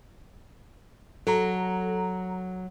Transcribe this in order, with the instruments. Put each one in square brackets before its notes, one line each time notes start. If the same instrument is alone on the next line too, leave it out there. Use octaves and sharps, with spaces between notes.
[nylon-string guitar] F#3 [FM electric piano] A4 A#5